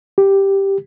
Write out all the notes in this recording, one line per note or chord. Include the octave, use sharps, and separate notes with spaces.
G4